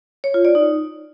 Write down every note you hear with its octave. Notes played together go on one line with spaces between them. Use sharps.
C#5
F4
D5
D#4